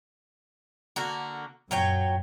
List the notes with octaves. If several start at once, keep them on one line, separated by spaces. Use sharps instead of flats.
D3 A#3 F#4
F#2 A#2 F#3 C#5 G5